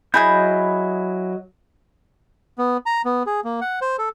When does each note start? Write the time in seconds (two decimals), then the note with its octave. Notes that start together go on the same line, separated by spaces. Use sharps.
0.14 F#3 E4 G#4 D#5 B5 G6
2.58 B3
2.86 A#5
3.05 B3
3.26 G#4
3.44 A#3
3.61 F#5
3.81 C5
3.98 A4